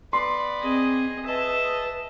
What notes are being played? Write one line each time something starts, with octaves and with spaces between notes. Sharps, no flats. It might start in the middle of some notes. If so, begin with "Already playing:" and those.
B3 B4 D5 C6
C4 G#4 D#5
G#4 B4 D#5 E5 A5